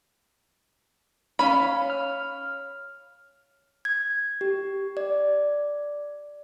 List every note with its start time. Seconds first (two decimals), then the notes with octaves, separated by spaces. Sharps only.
1.39 C#4 C#5 F5 B5
1.90 F6
3.85 G#6
4.41 G4
4.97 D5